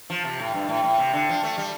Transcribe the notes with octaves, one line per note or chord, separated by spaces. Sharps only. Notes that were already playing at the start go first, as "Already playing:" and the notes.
F3
C3
A2
G2
A2
A2
C3
D3
F3
A3
G3